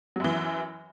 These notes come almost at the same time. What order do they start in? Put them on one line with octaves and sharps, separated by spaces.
F#3 F#2 E3